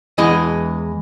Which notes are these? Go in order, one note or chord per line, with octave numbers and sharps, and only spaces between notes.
E2 E3 G#3 D#5